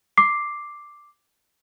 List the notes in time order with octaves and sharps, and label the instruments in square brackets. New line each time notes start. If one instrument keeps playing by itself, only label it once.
[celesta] D6 C7